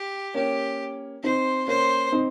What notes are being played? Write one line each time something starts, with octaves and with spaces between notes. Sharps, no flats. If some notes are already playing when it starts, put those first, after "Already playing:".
Already playing: G4
A#3 C#4 G4
C4 D#4 C5
A#3 C#4 C5
C4 D#4